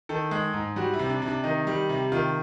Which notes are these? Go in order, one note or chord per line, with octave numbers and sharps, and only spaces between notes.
D#3 A4
G#3
G#2
G3 F#4
E4
C3
D4
C3
D4
D#3 D#4
G3
C3
D#3 F4